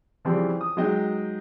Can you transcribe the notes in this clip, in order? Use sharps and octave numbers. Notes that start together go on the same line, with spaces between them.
C#3 E3 F3 G3 C4
D#6
F#3 G#3 D#4 D#5 G5